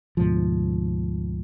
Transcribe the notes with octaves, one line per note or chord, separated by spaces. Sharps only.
D2 G#2 B2 F3